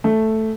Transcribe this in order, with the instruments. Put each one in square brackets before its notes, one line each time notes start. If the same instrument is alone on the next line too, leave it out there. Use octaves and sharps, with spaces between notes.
[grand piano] A3